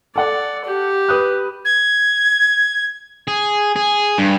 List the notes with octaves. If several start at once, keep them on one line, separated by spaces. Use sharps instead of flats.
A4 D5 F#5
G4
B4 D#6 F#6
G#6
G#4
G#4
G2